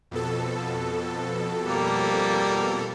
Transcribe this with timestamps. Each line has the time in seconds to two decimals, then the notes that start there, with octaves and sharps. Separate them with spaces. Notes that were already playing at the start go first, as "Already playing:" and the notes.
0.11 F2 B2 A4
1.65 G3 A#3